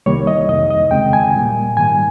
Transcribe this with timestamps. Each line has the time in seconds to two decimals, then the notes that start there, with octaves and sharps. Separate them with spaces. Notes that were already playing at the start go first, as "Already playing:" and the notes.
0.06 C2 C3 D#3 G3 A#3 C#5
0.27 D#5
0.49 F2 C3 D#3 D#5
0.70 D#5
0.91 D#2 C#3 G#3 C4 G5
1.13 G#5
1.34 A#2 G3 A#3
1.77 G#2 D#3 G3 A#3 G#5